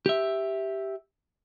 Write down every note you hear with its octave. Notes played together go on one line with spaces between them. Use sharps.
G4 E5